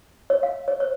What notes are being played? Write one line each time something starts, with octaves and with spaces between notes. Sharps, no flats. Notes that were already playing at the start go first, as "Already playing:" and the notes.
C#5
F5
C#5
C5 C#5